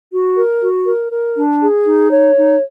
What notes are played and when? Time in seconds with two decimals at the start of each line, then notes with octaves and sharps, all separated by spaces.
0.12 F#4
0.36 A#4
0.62 F#4
0.86 A#4
1.12 A#4
1.35 D4
1.61 G#4
1.86 D#4
2.10 C#5
2.35 D#4